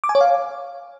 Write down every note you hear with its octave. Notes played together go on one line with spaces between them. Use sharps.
D6
G#5
C#5
F5